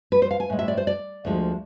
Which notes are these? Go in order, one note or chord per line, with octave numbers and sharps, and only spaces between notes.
B4
C5
F5
G#5
A2 G#3
E5
D5
C5
D5
D2 D3 F3 G#3